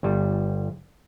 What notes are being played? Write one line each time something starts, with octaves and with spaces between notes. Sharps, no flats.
G1 G3